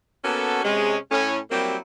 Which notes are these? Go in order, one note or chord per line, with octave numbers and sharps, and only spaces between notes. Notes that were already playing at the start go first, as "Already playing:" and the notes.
A#3 B3 C#4 F#4 A4
C3 G#3 C#4
A2 C#4
F#3 G3 A#3 C4 E4 G4